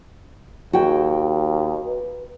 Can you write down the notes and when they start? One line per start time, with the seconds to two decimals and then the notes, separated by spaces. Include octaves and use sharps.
0.73 D#2 F#4 G#4 G5
1.86 B4